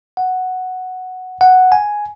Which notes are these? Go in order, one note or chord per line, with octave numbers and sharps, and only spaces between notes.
F#5
F#5
G#5